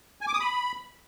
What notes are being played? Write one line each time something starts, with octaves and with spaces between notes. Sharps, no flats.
G#5
D6
D#6
B5